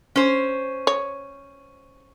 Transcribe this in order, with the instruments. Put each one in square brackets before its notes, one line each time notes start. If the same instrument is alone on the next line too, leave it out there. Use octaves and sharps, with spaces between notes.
[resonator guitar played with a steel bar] C#4 C5
[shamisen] C#5